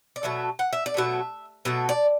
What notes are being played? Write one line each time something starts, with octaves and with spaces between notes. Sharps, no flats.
D5
B2 F#3 A3 E5
F#5
E5
D5
B2 F#3 A3 E5
B2 F#3 A3 E5
D5